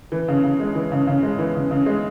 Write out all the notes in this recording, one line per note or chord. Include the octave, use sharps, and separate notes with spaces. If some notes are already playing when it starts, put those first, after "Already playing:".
E3
C#3
C#3
G#3
E3
C#3
C#3
G#3
E3
C#3
C#3
G#3